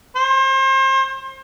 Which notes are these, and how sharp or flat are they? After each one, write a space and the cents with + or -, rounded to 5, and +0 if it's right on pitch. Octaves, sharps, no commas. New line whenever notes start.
C5 +35